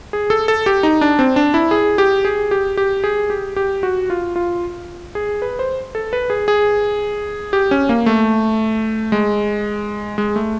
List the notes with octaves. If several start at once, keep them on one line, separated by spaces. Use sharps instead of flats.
G#4
A4
A4
G4
D#4
D4
C4
D4
E4
G#4
G4
G#4
G4
G4
G#4
G4
G4
F#4
F4
F4
G#4
B4
C5
A4
B4
G#4
G#4
G4
C#4
A#3
A3
G#3
G#3
A3